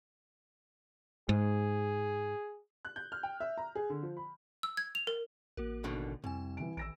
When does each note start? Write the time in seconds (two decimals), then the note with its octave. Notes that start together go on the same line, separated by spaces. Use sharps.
1.29 G#2 G#4
2.85 F#6
2.96 G6
3.12 F6
3.23 G5
3.40 E5
3.58 A#5
3.75 G#4
3.90 D3
4.03 F3
4.17 B5
4.63 E6
4.77 G#6
4.95 F7
5.07 A#4
5.57 A1 A#3 F#4 A#4
5.84 B2 D3 D#3
6.24 C2 F2 C4 G#5
6.57 E3 D7
6.77 A1 D#3 E6 A#6 D7